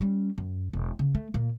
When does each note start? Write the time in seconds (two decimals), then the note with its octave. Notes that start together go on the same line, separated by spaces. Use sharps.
0.01 G3 C#4
0.38 F#2
0.73 E1
0.99 C#3
1.15 A3
1.34 A#2 A#3